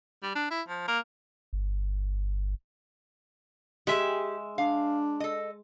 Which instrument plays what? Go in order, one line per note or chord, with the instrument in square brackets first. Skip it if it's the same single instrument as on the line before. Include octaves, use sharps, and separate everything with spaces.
[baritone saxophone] G3
D4
E4
F3
A#3
[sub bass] G1
[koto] G#3 E5 [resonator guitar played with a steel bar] G4 G#4
[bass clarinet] D4 [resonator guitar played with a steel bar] F5
[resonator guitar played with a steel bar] A4 D#5